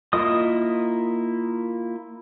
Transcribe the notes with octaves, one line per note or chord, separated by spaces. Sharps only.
A#3 E4 F4 D#5 D#6